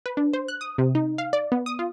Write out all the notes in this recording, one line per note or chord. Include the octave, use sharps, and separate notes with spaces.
B4
D4
C5
F#6
D#6
C3
D#4
F5
D5
B3
D#6
F4